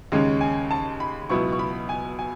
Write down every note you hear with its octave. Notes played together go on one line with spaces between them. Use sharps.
D#2 C#3 G#3 C#4
G#5
A5
B5
C#2 B2 F#3 B3 E4 C#6
C#6
B5
G#5
G#5